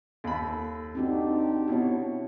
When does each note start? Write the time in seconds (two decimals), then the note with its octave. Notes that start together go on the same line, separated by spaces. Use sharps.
0.24 D#2 A4 B5
0.95 C4 D4 D#4 F#4 G4
1.68 B2 E4 F#4 C#5